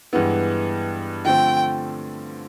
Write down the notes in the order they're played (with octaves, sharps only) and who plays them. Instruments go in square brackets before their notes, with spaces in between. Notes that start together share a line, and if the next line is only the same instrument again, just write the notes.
[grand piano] G2 E3 G#3 B3 E4
[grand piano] D3 F3 A3 C4 [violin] G5